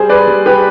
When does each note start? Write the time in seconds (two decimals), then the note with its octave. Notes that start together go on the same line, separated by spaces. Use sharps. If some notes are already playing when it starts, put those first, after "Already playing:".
Already playing: G3 G#4 C5
0.09 B4 D5
0.27 G3
0.46 G4 B4